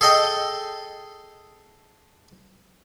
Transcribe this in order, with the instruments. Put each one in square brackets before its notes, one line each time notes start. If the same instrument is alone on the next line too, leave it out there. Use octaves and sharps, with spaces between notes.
[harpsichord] G#4 A4 D#5 G5 D#6